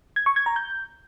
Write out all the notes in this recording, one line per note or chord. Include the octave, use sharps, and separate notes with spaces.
G#6
C#6
G#6
A#5
G6